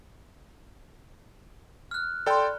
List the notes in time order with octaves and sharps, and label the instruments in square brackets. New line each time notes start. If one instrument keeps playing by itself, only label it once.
[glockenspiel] F6 F#6
[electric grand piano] A4 G5 [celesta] D5 C6 [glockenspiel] B5